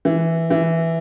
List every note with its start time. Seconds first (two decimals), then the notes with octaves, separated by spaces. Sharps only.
0.05 E3
0.50 E3